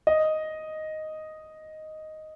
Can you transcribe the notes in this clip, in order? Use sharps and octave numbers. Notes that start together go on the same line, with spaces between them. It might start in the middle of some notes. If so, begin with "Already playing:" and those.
D#5